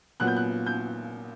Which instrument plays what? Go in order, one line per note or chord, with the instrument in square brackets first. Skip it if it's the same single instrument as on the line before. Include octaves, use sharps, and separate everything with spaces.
[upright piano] A#2 F#3 B3 F#6
G6
F#6
G6